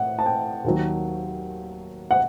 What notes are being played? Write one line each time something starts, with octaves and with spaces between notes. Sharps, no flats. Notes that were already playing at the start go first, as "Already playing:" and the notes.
Already playing: A2 F#5
A5
G5
D#2 D#3 F#3
F#5